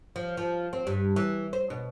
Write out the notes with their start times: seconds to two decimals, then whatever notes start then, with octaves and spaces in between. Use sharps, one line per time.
0.16 F3
0.37 F3
0.73 C4
0.87 G2
1.16 E3
1.53 C5
1.70 B2